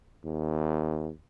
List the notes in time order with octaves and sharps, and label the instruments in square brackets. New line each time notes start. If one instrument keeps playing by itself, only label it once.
[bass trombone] D#2